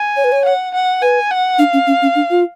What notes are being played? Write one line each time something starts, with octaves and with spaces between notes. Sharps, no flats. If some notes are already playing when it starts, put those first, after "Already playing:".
Already playing: G#5
C#5
B4
C#5
F#5
F#5
B4 G#5
F#5
D4 F5
C#4
C#4
C#4
D4
F4